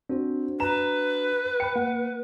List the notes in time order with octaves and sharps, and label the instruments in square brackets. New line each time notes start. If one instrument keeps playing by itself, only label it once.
[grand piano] C4 [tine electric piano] D4 F#4
[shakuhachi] B4 [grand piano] A#5 E7
[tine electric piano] G5 B5 [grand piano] C#7
[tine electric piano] A#3 [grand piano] F#5